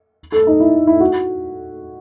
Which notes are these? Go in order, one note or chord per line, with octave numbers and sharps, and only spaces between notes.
A4
D#4
E4
E4
F#4